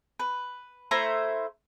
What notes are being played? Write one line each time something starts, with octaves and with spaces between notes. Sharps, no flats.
B4
A3 E4 C5 A#5